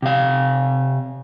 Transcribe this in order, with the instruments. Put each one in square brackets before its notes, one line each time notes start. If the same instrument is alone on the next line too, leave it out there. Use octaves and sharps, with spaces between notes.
[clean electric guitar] C3 F5